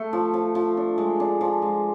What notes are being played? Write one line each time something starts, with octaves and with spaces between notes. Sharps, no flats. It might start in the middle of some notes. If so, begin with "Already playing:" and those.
Already playing: A3
F3
F3
F3
D4
G#3
D4
F3
G#3